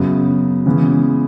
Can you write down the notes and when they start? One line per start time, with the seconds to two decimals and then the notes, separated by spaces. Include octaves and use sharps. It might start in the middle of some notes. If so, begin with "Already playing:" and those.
Already playing: F#2 C#3 F#3 B3
0.66 C#3 E3 G#3 B3